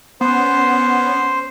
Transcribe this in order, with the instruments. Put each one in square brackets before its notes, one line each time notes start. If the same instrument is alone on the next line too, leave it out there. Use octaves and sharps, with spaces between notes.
[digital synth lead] B3 [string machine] C#4 [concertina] C5